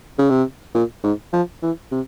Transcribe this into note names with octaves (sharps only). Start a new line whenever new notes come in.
C#3
C3
A#2
G#2
F3
E3
C3